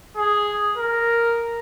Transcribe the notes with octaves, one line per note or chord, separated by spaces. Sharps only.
G#4
A#4